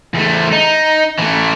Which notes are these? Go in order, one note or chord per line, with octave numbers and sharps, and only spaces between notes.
E2 A3
D#4
E3 A3